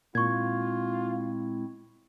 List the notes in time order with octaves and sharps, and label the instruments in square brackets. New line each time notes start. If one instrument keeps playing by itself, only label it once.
[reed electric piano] A#2 [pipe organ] G#3 C4 E4 [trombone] F4 [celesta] C#6 G#6